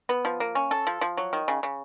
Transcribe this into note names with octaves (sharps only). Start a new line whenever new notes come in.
B3
F3
A#3
C#4
A4
F3
F3
F#3
D#3
C#3
C#3